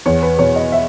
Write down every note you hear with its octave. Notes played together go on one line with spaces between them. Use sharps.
E2 C#5
B4
B2 C#5
D#5
E5